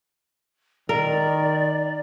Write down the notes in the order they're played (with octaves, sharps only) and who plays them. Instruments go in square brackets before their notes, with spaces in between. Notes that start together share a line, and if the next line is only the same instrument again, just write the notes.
[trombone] D#3 [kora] A#4 [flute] D5